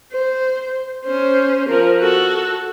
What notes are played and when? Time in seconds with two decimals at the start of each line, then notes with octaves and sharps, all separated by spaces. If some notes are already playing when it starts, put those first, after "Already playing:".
0.12 C5
1.04 C#4 C5
1.68 F3 A#4
2.01 F#4 A4